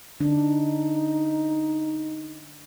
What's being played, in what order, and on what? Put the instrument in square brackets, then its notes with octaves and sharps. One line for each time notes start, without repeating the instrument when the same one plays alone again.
[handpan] D3 D4 [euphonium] D#4